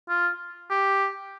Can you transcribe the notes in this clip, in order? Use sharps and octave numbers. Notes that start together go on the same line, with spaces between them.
F4
G4